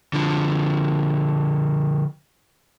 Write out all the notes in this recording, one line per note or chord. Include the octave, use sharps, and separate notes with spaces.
D3 F3